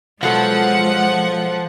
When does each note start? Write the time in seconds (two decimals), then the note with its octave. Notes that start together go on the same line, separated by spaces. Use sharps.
0.23 B2 F3 F#3 G#3 A4 F#5